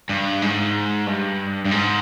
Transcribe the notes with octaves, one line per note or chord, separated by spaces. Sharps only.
G2
G#2
G2
G2
G#2